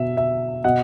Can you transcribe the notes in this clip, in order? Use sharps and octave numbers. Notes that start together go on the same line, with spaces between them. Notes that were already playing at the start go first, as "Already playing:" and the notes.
Already playing: B2 E5
E5
B2 D#5 F#5